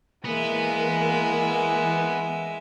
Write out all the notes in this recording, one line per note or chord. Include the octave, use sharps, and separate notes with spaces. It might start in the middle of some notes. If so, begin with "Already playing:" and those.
E3 G#3 A#3 B3 E5